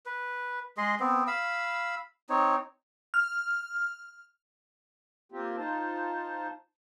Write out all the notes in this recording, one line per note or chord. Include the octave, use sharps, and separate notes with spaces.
B4
G#3 G#4 D#5 C6
B3 C4
F5 B5 E6
C4 D#4 C#5
F6
A#3 C4 F4 G4
D#4 F4 C5 A5